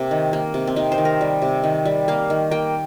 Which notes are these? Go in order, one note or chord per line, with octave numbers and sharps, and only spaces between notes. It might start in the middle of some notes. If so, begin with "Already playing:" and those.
Already playing: C3 A#3
D#3
A#3
C3
C4
C3 D#4
C5
D#3
A#4
G3
C3
D#3
G3
A#3 F5
D#3
A#3 G5